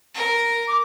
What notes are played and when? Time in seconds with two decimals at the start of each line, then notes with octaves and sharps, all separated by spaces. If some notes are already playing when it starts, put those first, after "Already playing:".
0.14 A#4
0.68 D6